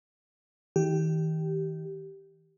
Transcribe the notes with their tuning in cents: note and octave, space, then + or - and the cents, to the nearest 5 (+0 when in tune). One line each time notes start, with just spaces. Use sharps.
D#3 +40 G4 -10